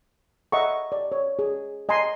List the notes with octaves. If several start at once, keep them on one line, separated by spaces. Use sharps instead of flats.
D#5 E5 F#5 A#5 C#6
D5
C#5
G#4
D#5 G#5 A#5 C6